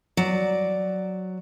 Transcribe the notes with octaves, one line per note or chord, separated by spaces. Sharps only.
F#3 D5